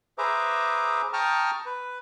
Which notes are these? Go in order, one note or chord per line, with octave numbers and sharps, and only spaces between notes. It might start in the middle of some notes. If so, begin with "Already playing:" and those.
G#4 B4 C5 E5 A#5 D6
G5 A5 A#5 C#6 D#6 F6
B4